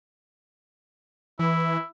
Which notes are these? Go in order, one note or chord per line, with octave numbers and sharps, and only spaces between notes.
E3 E4